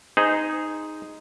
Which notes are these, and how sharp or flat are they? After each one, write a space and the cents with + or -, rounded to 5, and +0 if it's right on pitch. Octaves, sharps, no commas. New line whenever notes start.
D#4 +0 G#4 +0 C5 -25